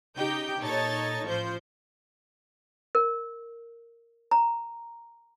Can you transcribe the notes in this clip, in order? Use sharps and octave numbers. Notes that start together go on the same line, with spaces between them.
C#3 D#4 G4 G5 G6
A#2 D#4 A4 C#5 C#6 A6
A1 F3 C5 G6
A#4
A#5